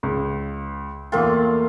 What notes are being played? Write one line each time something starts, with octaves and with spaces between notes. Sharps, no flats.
C#2
E2 A#2 A3 A#3 F4 G5